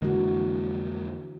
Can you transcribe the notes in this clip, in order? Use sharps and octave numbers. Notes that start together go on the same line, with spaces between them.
F2 D3 E3 G#3 A#3 F#4